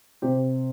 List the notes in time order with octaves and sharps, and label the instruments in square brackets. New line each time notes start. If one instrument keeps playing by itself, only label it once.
[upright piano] C3 G4